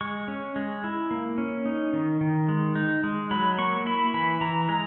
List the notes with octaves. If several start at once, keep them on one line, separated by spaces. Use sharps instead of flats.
G#3 C#6
C#4
G#3
E4
A#3
C#4
D#4
D#3
D#3
G#3
D#4
G#3
F#3 B5
A#3 C#6
E4 B5
E3 B5
E3 A#5
G#3 A#5